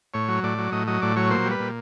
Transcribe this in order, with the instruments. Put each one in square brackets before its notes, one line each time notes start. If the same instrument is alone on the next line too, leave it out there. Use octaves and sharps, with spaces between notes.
[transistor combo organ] A2 C#5
F#3
A2 D5
F#3
A2 D#5
F#3 D#5
A2 D5
F#3 C#5
A#2 C5
G3
B4
A#2